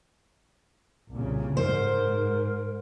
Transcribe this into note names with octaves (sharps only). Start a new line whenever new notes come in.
C2 A#2 C#3
G#2 A#4 C5